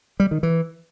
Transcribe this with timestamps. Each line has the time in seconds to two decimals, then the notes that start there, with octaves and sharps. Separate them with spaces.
0.20 G3
0.31 D#3
0.43 E3